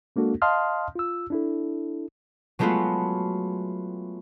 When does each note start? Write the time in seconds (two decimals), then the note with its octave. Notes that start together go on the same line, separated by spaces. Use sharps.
0.16 G#3 A#3 D4 F#4 A4
0.42 D#5 F5 A5 C6 D#6 F6
0.96 F4 E6
1.30 D4 E4 A4
2.59 F#3 G#3 A3 B3 F4 F#4